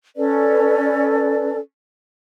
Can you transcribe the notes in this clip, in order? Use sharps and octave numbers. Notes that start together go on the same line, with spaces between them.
C#4 A4 B4 D5